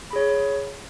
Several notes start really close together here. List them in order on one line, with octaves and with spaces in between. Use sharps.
B5 G#4 C#5